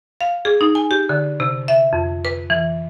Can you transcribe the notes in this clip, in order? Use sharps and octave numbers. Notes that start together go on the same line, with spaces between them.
F5
G#4
D#4
G#5
G4
D3
C3
E5
F2
B4
E3